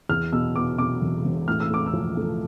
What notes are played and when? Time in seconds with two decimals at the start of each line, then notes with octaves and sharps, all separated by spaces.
0.09 E2 F6
0.33 B2 E6
0.56 B2 D6
0.78 B2 D6
1.02 E1
1.24 E1
1.48 A2 F6
1.60 E6
1.70 A3 D6
1.86 E6
1.93 F3
2.17 A3